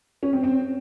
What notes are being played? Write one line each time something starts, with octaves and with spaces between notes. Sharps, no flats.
C#4
C4
C4